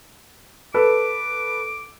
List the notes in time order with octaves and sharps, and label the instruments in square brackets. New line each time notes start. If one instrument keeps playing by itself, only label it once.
[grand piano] A4 B4 [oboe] D6